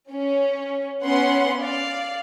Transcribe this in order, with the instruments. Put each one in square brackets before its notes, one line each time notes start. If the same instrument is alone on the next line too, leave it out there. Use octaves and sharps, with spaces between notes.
[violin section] C#4
B3 C#4 F#5 C6
D5 F5